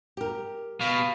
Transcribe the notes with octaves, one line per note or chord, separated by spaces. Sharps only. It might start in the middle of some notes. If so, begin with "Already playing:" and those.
G4 A#4
B2 F5